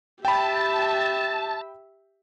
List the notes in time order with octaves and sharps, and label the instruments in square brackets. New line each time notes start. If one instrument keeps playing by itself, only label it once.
[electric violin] G4 E5 [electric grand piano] G5 B5 [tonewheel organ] A5